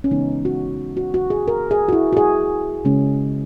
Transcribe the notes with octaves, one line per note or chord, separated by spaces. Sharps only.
C#4
C#3 E3 G#3 B3 D#4
F#4
F#4
F#4
G#4
A#4
G#4
F#4
E4
F#4
G#4
C#3 G#3 C#4